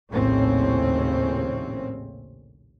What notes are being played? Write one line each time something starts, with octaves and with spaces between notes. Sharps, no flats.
A#1 D#2 A2 C#3 C4 C#4